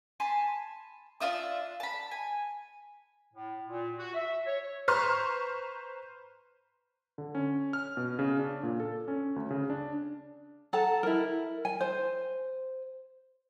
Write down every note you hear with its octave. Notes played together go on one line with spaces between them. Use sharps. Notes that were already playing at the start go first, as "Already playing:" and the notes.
G#5 A5 B5 C6
D4 F4 E5 D#6
A5 B5
G#5
A2
A#2
F#4
E5
C#5
B4 C5 A#5 C6 C#6 F6
D3
C#4
F6
B2
C#3
D4
A#2
A4
C#4
D2
C#3
D4
A4 F#5 A5 A#5
E4 A#4
G#5
C5